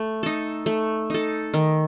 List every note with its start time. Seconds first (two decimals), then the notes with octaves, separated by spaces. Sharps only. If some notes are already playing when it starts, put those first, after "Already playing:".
Already playing: A3
0.23 D#4 A4
0.66 A3
1.10 D#4 A4
1.54 D#3